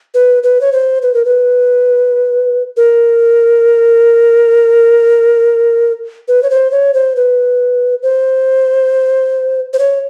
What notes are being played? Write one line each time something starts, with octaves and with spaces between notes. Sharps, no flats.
B4
B4
C#5
C5
B4
A#4
B4
A#4
B4
C#5
C5
C#5
C5
B4
C5
C5
C#5